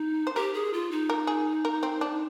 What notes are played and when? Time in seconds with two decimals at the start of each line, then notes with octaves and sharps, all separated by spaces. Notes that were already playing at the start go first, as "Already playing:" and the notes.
Already playing: D#4
0.27 C5
0.36 G4 A#4
0.54 G#4
0.73 F4
0.91 D#4
1.10 A#4
1.27 G#4
1.65 A#4
1.83 C4
2.01 D4